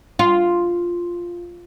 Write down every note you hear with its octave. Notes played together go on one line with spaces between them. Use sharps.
F4